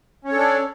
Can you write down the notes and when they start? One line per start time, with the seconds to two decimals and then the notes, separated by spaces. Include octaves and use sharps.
0.25 C#4
0.28 C#5
0.32 A4
0.36 D4
0.39 D5